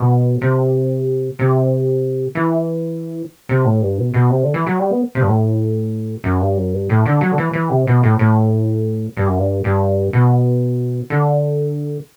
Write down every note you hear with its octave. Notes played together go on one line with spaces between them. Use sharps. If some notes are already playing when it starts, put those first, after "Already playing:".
Already playing: B2
C3
C3
E3
C3
A2
G2
B2
B2
C3
D3
E3
F#3
G3
B3
C3
G2
A2
F#2
G2
F#2
G2
A2
D3
F#3
D3
E3
E3
C3
B2
A2
A2
G2
F#2
G2
G2
B2
D3